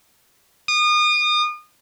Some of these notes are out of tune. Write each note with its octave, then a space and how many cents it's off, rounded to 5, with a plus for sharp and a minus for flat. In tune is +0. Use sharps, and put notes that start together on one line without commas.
D#6 -35